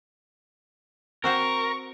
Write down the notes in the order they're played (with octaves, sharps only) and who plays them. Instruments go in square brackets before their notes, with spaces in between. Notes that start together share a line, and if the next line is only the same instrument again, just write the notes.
[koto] C4 F#4 C5 [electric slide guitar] A#4 [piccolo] C#6